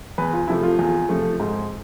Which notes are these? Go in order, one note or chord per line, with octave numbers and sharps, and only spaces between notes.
E2 B4
F4
C3 F3 A3 E4
F4
E2
C3 F3 A3
G#2